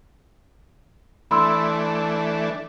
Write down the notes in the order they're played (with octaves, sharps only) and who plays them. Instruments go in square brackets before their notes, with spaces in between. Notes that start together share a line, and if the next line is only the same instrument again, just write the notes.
[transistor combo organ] E3 A3 D4 [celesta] B5 C6 E6